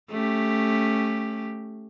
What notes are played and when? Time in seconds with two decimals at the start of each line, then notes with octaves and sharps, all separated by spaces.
0.10 A3 C#4 G4